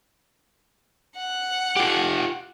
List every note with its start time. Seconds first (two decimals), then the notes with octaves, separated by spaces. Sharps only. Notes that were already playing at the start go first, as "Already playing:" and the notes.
1.17 F#5
1.76 F4 G4